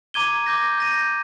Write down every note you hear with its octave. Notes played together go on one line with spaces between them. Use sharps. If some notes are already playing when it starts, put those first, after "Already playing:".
A#5 D6 G#6 D#7 G7
D6 G6 A#6
G6 A#6 D#7